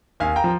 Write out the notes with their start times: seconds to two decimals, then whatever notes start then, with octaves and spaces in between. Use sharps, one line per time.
0.20 D#2 F5 G#5
0.36 G5 A#5
0.44 F3